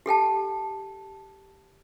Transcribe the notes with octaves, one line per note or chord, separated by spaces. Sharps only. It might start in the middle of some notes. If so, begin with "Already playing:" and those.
G4 A4 G5 A5